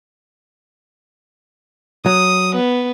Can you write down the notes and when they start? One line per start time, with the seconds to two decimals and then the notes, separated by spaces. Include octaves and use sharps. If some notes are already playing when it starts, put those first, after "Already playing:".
2.06 F#3 D#6
2.56 B3